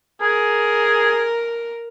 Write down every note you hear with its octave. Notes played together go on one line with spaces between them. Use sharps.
G#4 A#4